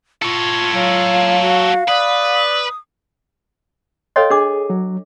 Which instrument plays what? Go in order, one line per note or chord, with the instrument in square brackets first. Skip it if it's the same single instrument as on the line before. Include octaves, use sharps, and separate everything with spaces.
[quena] F4 [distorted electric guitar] A4 C#5
[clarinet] F#3 [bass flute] F5
[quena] F#4
[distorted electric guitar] B4 [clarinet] D5 [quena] D#6
[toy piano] A4 C#5 D#5 [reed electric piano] F5 G5 C6
[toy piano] D4 D6 [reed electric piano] G#4
[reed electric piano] F#3